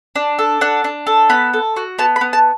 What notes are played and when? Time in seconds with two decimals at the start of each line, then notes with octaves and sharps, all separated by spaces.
0.16 D4
0.39 A4
0.61 D4 F#5
0.84 D4
1.07 A4
1.30 B3 B5
1.54 A4
1.76 F#4
1.99 B3 A5
2.16 B5
2.21 B3
2.33 A5